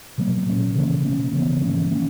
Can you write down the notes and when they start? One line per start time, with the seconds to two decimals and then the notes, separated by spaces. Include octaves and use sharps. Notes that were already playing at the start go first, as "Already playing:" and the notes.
0.18 B2 F#3 A#3
0.46 A#2 A#3 C#4
0.75 C#3 E3 A#3 C#4
1.05 B2 A#3 C#4
1.33 C#3 E3 B3
1.62 G#2 E3 A#3 C#4
1.91 D#3 A#3 C#4